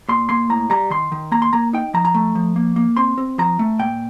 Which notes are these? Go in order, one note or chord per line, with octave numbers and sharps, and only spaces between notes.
A#2 C6
A#3 C6
A2 A#5
G3 A#5
D#3 C6
D#3
A#3 A#5
C6
A#3 A#5
D#4 G5
F3 A#5
A#5
A3
F3
A#3
A#3
C4 C6
C4
F3 A#5
A3
A#2 G5